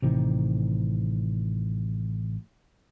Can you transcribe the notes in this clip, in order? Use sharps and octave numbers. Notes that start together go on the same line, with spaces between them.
A1 C3 D#3